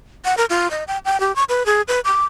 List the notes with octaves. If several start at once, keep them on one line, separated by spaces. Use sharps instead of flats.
F#5
A#4
F4
D#5
G5
G5
G4
C#6
B4
G#4
B4
D6